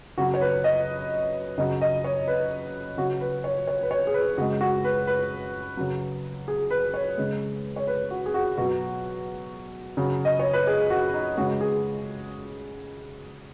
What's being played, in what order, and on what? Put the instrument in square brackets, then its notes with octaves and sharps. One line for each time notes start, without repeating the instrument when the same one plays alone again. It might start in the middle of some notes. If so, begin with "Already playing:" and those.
[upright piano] C#3 F#3 F#4
C#5
B4
D#5
C#3 F#3 D#5
D#5
C#5
B4
C#3 F#3 F#4
B4
C#5
C#5
B4
C#5
G#4
B4
C#3 F#4
G#3
F#4
B4
B4
C#3 F#3
G#4
B4
C#5
C#3 G#3
C#5
B4
F#4
G#4
F#4
B2 F#3 F#4
C#3 F#3
D#5
C#5
B4
G#4
F#4
D#4
C#3 G#3 F#4
G#4